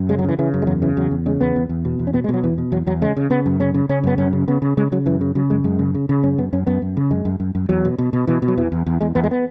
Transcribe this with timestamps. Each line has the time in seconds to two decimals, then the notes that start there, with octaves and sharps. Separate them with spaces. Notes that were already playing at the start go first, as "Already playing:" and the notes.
Already playing: F#2
0.09 C#3 G#3
0.19 F#3
0.24 C#3 E3
0.39 C#3 E3
0.54 F#2
0.62 G#3
0.67 E2 F#3
0.82 C#3 E3
0.97 E2 F#3
1.11 E2
1.26 C#3 G#3
1.41 E2 B3
1.56 E2
1.69 E2
1.85 B2
1.99 E2
2.07 C#4
2.13 B2 B3
2.24 G#3
2.29 B2 F#3
2.43 E2 E3
2.58 B2
2.72 E2 F#3
2.87 E2 F#3
3.02 C#3 G#3
3.17 C#3
3.30 C#3 B3
3.46 F#2
3.60 C#3 C#4
3.74 C#3
3.89 C#3 C#4
4.04 F#2 B3
4.18 F#2 C#4
4.33 C#3
4.48 C#3 B3
4.62 C#3
4.77 C#3 G#3
4.92 C#3 F#3
5.06 F#2 E3
5.21 C#3
5.35 C#3 F#3
5.50 F#2 G#3
5.64 F#2 G#3
5.79 C#3
5.95 C#3
6.09 C#3
6.23 F#2 C#4
6.38 F#2 B3
6.53 F#2 C#4
6.67 F#2 B3
6.82 F#2
6.97 C#3
7.11 F#2 G#3
7.25 F#2
7.40 F#2
7.55 F#2
7.69 E2 F#3
7.85 B2
7.98 B2
8.13 B2
8.27 B2 E3
8.42 B2
8.48 F#3
8.58 E2 E3
8.72 E2
8.86 E2
9.01 E2 G#3
9.15 E2 B3
9.24 G#3
9.31 B3